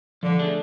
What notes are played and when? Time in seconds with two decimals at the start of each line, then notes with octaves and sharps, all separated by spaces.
0.23 D3 F3
0.39 A3 D4 G#4